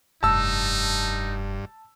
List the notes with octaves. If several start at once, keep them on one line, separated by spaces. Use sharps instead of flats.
F1 G2 D#4 A5 E6